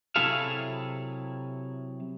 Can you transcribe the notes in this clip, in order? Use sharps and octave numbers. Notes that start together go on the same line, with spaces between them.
C3 F#3 E4 G#4 A4 F5